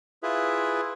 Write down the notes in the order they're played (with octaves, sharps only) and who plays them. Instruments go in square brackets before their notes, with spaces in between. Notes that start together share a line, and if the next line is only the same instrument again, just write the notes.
[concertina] E4 F4 G#4 B4 E5